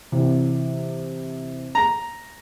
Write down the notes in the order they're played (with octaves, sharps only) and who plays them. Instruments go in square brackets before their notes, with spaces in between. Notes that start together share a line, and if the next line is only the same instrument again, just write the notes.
[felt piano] C3 E3
[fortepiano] A#5